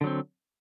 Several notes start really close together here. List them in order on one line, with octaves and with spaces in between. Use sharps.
D3 F#3 C4